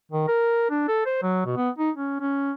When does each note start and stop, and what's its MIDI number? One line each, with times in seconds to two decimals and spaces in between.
0.12 0.27 51
0.28 0.68 70
0.70 0.83 62
0.88 1.02 69
1.06 1.21 72
1.23 1.44 54
1.46 1.57 47
1.57 1.70 59
1.78 1.91 63
1.97 2.16 61
2.21 2.52 61